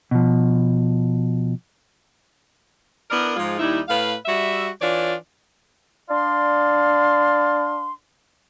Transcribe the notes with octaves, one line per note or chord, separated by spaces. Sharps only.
B2 F3
B3 D4 E4 A#4
G#2 F3 G#3 F4
D#2 G3 D#4 E4
A2 B4 F5
G3 F#4 E5
E3 D4 F4 C#5 D5
D4 D5 F5 C6